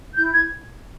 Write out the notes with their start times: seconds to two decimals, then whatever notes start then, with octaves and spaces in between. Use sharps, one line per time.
0.15 E4 G6
0.32 G#6